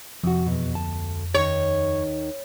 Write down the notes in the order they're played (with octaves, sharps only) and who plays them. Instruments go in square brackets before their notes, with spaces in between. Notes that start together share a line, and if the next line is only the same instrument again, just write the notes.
[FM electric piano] F2 [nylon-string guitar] C3 F#4
[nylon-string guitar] E2 B2
D2 A5
[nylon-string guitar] D#2 D#3 D#4 [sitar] C#5